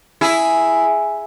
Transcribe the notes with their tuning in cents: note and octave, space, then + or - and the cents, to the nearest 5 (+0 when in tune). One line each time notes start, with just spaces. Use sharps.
E4 +0 G#4 +0